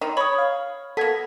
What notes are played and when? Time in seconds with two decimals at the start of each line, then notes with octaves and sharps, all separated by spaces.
0.01 D#3 C4 D#4
0.17 C#5 B5 D#6
0.38 F5
0.97 A#3 B3 A4 G#6 B6